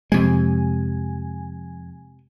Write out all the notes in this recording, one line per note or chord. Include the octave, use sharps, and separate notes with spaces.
F2 C3 G#3 G#5